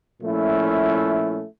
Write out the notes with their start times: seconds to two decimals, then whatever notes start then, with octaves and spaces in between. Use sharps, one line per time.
0.21 A#2 F3 A3 C#4 E4